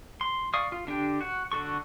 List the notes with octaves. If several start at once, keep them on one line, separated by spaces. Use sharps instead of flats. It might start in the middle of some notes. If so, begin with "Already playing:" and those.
C6
D5 F5 C#6 D#6
F4
D3 D4 G4 G5
F#4 F#5
D3 F#4 A4 C#6